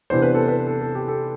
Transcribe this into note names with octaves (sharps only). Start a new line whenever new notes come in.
C3 E3 B3 D4 C5
B4
A4
B4
A4
A4
G4
A4